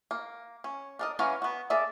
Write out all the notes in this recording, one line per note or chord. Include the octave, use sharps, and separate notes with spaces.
A#3
C#4
D4 A#4 D#5
E3 C#4 F5 F#5 A#5
B3 F#4
A#3 G#4 A4 D5 E5